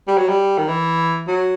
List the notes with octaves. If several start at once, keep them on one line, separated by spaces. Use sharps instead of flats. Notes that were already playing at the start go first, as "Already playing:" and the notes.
G3
F#3
G3
D#3
E3
F#3